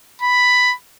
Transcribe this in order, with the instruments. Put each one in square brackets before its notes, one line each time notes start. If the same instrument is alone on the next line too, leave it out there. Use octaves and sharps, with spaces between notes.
[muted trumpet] B5